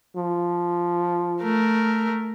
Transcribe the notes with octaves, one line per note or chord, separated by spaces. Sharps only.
F3
A3 A#4